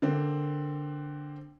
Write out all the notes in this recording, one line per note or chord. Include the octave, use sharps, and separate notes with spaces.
D3 A#3 C4